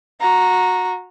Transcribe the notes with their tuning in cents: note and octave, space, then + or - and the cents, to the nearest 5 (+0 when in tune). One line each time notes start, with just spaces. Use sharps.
F#4 -20 A#5 +0